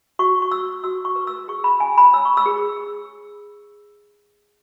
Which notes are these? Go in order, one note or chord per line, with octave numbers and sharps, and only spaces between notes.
F#4 C#6
C#6
F#4 E6
F#4 E6
C#6
B4
E6
G#4 C#6
B5
C#4 G#5
B5
C#5 E6
C#6
E6
G#4